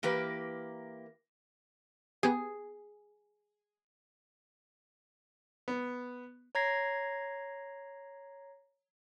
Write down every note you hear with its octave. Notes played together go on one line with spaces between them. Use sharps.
E3 A#3 G4 A#4 B4
B3 G4 G#4
B3
C#5 A#5 G#6 A#6 C7